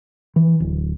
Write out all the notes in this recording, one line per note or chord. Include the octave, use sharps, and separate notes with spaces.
E3
D1